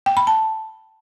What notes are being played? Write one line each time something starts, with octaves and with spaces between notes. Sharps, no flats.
G5
B5
A5